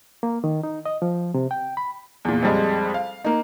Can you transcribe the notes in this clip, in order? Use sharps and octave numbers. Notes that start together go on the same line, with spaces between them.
A#3
D#3
D#4
D#5
F3
C3
G5
B5
E2 A#2
F2 G3 G#3
F5
A#3 D#4